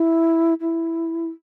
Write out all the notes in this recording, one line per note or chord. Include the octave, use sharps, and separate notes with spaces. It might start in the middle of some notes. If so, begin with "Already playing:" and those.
Already playing: E4
E4